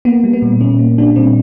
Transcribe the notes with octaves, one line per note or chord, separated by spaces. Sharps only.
A#3 B3
G3
B3
A#2
A#2 C#4
A#3
G3 D4
A#2 C4